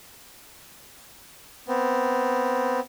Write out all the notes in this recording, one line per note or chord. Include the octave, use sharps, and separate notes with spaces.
B3 C4